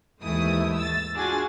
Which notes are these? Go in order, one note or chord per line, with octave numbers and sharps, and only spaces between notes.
D#2 G#2 E3 A3 E4 D#6
E6 A6
D4 F4 F#4 G#4 G#5 A6